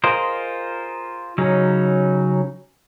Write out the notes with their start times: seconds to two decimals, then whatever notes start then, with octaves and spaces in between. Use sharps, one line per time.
0.04 F4 G#4 A#4 C5 D#5
1.38 C#3 F#3 C#4 D#4